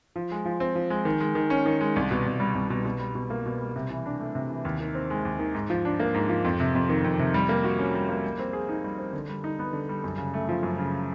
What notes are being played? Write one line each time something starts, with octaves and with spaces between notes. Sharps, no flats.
F3
G#3
F3
C4
F3
G#3
D#3
G#3
D#3
C#4
D#3
G#3
C2
B2
C2
G3
C2
B2
B2
G3
B2
A#3
B2
G3
C3
E3
D4
A3
C3
E3
D#2
D#3
C4
G#3
D#2
D#3
G#2
F3
D4
A#3
G#2
F3
F2
C3
F2
D#3
F2
C3
G3
A#3
F#4
C#4
G3
A#3
G3
C4
G#4
D#4
G3
C4
D3
G3
D#4
B3
D3
G3
F#2
C#3
A3
F3
F#2
C#3